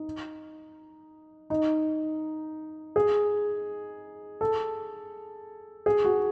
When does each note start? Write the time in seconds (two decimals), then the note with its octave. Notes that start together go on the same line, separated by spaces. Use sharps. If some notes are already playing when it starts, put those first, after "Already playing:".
Already playing: D#4
1.50 D#4
2.96 G#4
4.41 A4
5.86 G#4
6.04 F#4